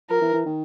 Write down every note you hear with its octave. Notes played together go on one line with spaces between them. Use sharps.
F3 A#4
E3
E3
D#3